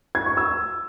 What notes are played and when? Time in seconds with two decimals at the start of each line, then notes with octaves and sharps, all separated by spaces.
0.15 G#6
0.26 C#6
0.37 E6